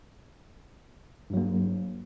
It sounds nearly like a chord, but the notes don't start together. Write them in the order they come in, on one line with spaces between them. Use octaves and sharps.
G2 F#3 A#3